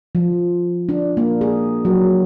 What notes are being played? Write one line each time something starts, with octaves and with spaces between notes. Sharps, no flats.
F3
D4
A#3
G#4
F#3